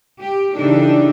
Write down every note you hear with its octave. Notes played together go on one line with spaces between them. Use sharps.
G4
C#3 E3 D4 D#4 G4 A4